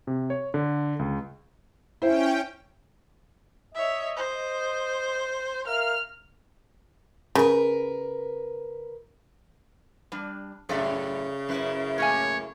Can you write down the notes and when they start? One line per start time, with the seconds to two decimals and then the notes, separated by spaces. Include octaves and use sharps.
0.07 C3
0.30 C#5
0.54 D3
0.99 C#2
2.02 C#4 E4 C5 G5
3.75 C#5 D#5 E5
4.17 C5
5.67 A#4 E5 F5 F6
7.35 C#3 A#4 B4
10.12 G3 D4
10.69 F#2 A2 C#3 A4 D5 E5
11.49 F#2 E4 B4
11.98 A2 A#3 C#5 G#5